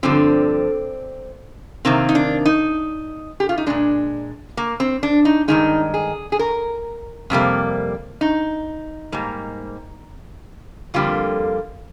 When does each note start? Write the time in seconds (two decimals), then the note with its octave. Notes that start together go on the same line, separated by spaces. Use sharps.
0.03 G2 D3 F3 C4
1.85 C3 D#3 A#3 C4
2.09 D#4
2.15 D4
2.45 D#4
3.40 G4
3.49 F4
3.58 D#4
3.66 A#2 G#3 D4
4.57 A#3
4.80 C4
5.03 D4
5.25 D#4
5.48 G2 D#3 G#3 D#4
5.94 G#4
6.32 G#4
6.39 A#4
7.30 F2 C3 G3 A#3
8.21 D#4
9.12 G#2 G3 A#3
10.94 F2 D3 G3 A#3 F4